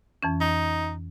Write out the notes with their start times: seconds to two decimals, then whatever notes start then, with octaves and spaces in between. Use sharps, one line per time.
0.23 F2 E3 C#4
0.41 D#4